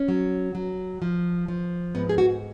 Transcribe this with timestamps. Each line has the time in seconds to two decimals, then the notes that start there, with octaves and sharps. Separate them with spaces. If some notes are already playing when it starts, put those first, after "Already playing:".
Already playing: C#4
0.08 F#3
0.55 F#3
1.02 F3
1.48 F3
1.95 G#2 B3
2.09 G#4
2.18 F#4